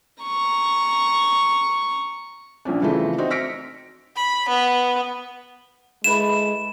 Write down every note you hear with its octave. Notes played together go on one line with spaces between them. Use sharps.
A#5 C#6
A#1 A#2 C#4 D4
C#3 E3 F3 A3 C4
C4 D#4 F#4 E5
E6 F6 A#6 B6 C#7 D7
B5
B3
G#3 A3 E4 B4 E7